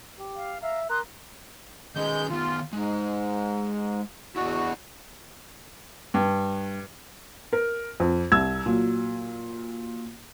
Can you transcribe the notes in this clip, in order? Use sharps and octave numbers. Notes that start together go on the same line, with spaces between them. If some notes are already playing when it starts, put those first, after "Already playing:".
G4
F5
E5 F5 A#5
A#4 C6 D#6 F#6
D#3 G#3 C#4 B4 G6
D#3 B3 F4
G#2 G#3
E2 E4 F#4 D5 D#5
G2
A#4
F2
C2 E6 G#6
A#2 F#3